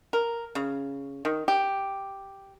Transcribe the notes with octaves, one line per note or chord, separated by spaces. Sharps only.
A#4
C#3
D#3
G4